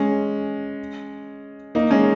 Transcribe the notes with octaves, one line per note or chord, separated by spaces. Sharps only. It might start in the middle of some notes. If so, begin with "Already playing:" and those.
Already playing: G#3 C#4
A#3 D#4
G#3 C#4